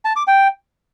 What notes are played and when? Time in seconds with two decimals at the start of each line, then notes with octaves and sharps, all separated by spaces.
0.05 A5
0.16 D6
0.27 G5